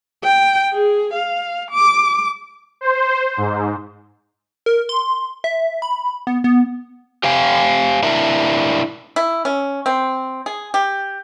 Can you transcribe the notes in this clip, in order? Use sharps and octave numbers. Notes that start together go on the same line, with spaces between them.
G5
G#4
F5
D6
C5
G#2
A#4
C6
E5
B5
B3
B3
G4 C5 F5 G5 G#5
D4 E4 A#4 E5
E4
C#4
C4
G#4
G4